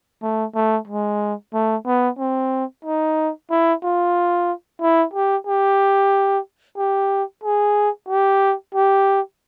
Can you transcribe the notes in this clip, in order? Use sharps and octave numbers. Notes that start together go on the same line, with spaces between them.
A3
A3
G#3
A3
B3
C4
D#4
E4
F4
E4
G4
G4
G4
G#4
G4
G4